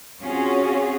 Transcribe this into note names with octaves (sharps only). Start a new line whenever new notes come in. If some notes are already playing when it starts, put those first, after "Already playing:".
C4 C#4 F4 F#4 G#4